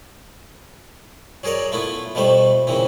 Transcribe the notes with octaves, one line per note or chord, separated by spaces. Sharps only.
F#3 G#4 A#4 C#5 D5
A3 B3 E4 F4
B2 F3 G3 A3 C5
A#2 C#3 E3 C4